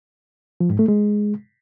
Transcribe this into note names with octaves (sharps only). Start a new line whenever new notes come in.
F3
G#2
A3
G#3